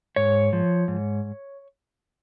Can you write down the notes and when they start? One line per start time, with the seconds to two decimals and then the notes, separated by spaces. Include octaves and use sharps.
0.16 G#2 C#5
0.53 F3
0.88 G#2